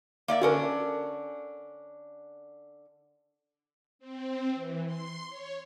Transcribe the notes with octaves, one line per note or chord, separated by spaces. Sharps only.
A#3 D5 E5
D3 C#4 D4 F#4 A4 A#4
C4
E3
C6
C#5